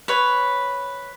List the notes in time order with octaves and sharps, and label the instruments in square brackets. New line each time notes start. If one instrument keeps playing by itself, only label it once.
[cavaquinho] B4 C#5